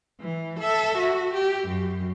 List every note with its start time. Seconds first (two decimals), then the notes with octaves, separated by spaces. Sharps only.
0.21 E3
0.60 A4 E5
0.98 F#4
1.34 G4
1.68 F#2